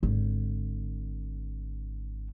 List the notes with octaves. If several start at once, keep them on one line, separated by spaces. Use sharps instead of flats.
G#1 D3